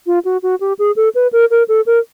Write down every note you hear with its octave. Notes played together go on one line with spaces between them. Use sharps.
F4
F#4
F#4
G4
G#4
A4
B4
A#4
A#4
A4
A#4